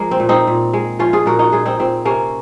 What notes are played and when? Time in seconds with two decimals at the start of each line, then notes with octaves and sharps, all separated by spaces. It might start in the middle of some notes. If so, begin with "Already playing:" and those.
Already playing: F3 G#3 A#3
0.11 C4
0.20 A#2
0.29 C4 D#4
0.47 A#2
0.73 G#3
0.99 F3 C#4 F4
1.13 F4 G#4
1.26 A#2 F#4 A#4
1.39 D#4 F#4
1.52 A#2 F4 G#4
1.66 C4 D#4
1.79 A#2 C4
2.05 C3 A#3 C#4